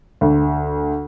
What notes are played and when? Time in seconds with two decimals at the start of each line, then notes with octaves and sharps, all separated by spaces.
0.21 D2